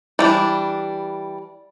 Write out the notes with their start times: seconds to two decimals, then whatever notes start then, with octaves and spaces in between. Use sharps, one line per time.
0.19 E3 G3 D4